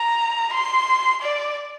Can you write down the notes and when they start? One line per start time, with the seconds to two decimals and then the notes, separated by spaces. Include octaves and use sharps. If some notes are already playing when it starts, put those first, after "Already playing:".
Already playing: A#5
0.53 C6
1.22 D5